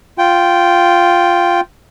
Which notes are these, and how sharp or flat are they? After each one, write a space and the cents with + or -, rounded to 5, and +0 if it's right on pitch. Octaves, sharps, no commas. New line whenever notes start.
F4 +0 G5 -5